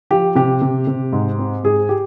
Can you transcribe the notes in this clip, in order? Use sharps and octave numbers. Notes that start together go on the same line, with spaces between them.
F3 G4
C3 G4
C3
C3
G#2
C4
G#2 G#4
G4